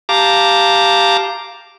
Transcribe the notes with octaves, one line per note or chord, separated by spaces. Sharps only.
G4 F5 A5 A#5 D6